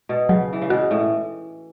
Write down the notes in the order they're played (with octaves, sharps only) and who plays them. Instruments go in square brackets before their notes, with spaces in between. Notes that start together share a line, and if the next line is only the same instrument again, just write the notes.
[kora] B2
[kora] C#3 [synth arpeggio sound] F#3
[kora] E3
C#3
[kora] B2 [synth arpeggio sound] F#4
[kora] A2